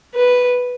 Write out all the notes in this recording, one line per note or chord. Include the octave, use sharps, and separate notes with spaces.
B4